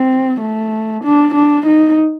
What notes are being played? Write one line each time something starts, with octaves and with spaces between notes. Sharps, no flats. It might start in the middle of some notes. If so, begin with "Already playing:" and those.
Already playing: C4
A3
D4
D4
D#4